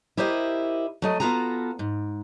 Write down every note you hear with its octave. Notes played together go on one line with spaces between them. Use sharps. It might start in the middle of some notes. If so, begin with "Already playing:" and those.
E4 G4 A#4 C5 D#5
F#3 A3 D#5
B3 F4 F#4 A4 A#5
G#2